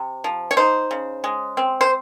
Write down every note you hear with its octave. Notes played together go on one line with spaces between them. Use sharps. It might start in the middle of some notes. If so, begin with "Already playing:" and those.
Already playing: C3
F3
C#5
D#4 C5
C#3
G#3
C4
C5